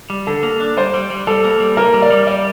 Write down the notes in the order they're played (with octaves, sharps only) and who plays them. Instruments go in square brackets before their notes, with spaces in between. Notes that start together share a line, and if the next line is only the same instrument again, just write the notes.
[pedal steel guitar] G3
[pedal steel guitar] D3 [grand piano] A4
[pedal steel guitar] A#3
D4
[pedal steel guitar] G3 [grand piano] C5
[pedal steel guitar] G3
G3
[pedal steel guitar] G3 [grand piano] A4
[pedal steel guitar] A#3
G3
[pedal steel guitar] A#3 [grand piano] A#4
[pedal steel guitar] G3
[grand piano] D5
[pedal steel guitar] G3
[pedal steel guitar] G3 [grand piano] D5